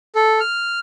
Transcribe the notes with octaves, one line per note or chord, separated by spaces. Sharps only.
A4
F6